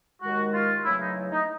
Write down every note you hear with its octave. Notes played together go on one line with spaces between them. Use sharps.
D#2 D#3 G#3 F#4
F4
E2 C#3 F#3 A3 E4
D#4
D#4